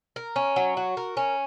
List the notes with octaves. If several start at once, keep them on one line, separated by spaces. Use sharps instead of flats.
A#4
C#4
F#3
F#4
A#4
C#4